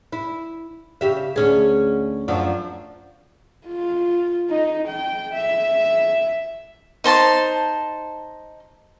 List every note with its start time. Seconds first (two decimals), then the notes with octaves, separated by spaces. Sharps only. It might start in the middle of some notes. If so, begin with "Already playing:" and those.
0.12 E4
1.01 C#3 G4 E5
1.36 D2 C#4 G#4
2.28 F#2 F3 D4
3.67 F4
4.50 D#4
4.88 G5
5.34 E5
7.04 D#4 C5 A5 C6